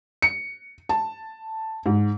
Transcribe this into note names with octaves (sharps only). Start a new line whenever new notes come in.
C#7
A5
G#2